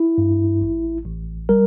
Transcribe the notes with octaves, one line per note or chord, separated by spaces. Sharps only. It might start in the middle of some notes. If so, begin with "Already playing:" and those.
Already playing: E4
G2
A1
A1
G3 A#4